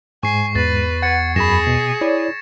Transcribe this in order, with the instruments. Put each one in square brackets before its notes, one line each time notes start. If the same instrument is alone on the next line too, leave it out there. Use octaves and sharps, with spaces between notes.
[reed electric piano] G#2 G#3 [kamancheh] G#5 [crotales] C#6 C7
[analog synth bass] E2 [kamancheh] B4 [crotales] A6
[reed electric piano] F#5 [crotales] G#6 A6 C#7
[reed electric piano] F#2 B5 [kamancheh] G#4 [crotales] A#6 E7
[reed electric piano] B2
[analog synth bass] E4 [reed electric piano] C#5 D5